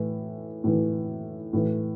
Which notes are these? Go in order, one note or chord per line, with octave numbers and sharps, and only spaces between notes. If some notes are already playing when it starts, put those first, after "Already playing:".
Already playing: A2 E3
A2 E3
A2 E3